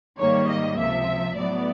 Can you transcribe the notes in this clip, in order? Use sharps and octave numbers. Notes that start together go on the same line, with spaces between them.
G#2 D#3 G3 A#3 C#5
D#5
C#2 C3 F3 E5
A2 F#3 B3 D5